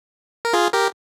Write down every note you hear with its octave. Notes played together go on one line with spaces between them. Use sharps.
A#4
F4 G#4
G4 A#4